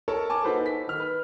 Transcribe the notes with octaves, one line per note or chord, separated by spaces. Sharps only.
A4 A#4 C#5 A5
G#5 A5 D6
A#3 D#4 F#4 A4 B4 C5
A4 B6
D#3 F6
B4